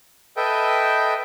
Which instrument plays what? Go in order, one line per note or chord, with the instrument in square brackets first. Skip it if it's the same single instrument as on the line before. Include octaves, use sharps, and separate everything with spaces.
[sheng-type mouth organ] A4 B4 D#5 E5 G5